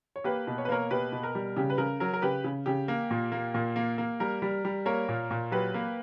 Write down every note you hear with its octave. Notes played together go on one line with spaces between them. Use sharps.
C#5
A#3 G4 B4
B2
C#5
B4
A#3 A#4 C#5
B2 G4 B4
B2
A#4
G3
C#3 G4
B4
C#3 A#4
F#3 A#4
A#4
C#3 G4 B4
C#3
C#3 G4
A#3
A#2
A#3
A#2
A#3
A#3
G3 A#4
G3
G3
A#3 A#4 C#5
A#2
A#2
F#3 G4 B4
A#3